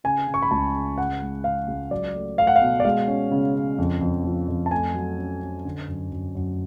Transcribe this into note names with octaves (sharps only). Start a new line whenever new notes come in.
C#3 G#5
C#3
C#6
B5
C#2 A5
C#3
C#3 F#5
G#3
C#3 F5
C#2
F#3 D5
A3
A3 F5
F#5
F5
B2
D5
G#3 F5
C#4
C#3
C#4
F2
F2
F3
F2
A5
A3 G#5
F#3
C#4
C#4
D3
F#2
F#2
F#2